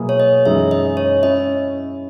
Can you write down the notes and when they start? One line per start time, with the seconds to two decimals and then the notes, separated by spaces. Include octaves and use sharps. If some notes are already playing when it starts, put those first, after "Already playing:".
Already playing: B2 F#3 A#3 E4 G#4
0.09 C#5
0.20 D#5
0.45 F#2 E3 G#3 D#4 G#4 E5
0.71 D#5
0.97 C#5
1.23 C#4 E4 D#5